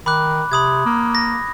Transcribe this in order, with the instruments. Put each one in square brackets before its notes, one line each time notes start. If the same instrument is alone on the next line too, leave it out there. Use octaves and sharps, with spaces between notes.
[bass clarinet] D#3 [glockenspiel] B5 D6 F#6
[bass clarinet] C3 [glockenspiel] B5 D#6 G#6
[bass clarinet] A#3
[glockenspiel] A#6